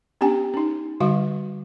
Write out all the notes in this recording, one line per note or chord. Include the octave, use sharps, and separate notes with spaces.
B3 C#4 D4 G4 G5 G#5
C#4 D#4
D3 G3 F#4 F5 C#6